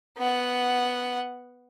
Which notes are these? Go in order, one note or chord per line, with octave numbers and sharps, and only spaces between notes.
B3 F#5